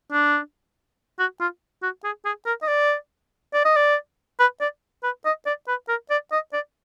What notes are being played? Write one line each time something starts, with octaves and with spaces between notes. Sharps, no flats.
D4
F#4
F4
F#4
G#4
G#4
A#4
D#5
D5
D5
D#5
D5
B4
D5
B4
D#5
D5
B4
A#4
D5
D#5
D5